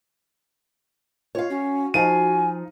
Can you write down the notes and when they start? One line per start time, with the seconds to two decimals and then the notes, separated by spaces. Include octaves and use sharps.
1.35 F4 C#5 F5
1.50 C#4 F#4
1.94 F3 D#4 F5 G#5 D#7